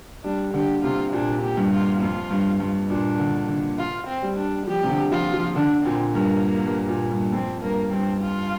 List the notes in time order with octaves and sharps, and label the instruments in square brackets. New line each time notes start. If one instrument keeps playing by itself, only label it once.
[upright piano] G3 [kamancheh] D4
[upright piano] D3 [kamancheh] G4
[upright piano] C3 [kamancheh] F4
[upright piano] A#2 [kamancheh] D4
[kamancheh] G4
[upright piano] G2
[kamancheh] F4
[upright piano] F2 [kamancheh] F4
[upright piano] G2
G2
[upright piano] A#2 [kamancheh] D4
[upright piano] D3
D3
[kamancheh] F4
C4
[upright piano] G3
[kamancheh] D4
[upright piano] F3 [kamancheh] G4
[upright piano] C3
D3
[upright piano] F3 [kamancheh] F4
[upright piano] F3
[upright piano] D3 [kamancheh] D4
[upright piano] A#2 [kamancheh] C4
[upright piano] G2 [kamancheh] A#3
[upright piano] G2
A#2
G2
[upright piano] F2 [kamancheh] C4
[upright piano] G2 [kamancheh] A#3
[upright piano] G2 [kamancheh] C4
[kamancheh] F4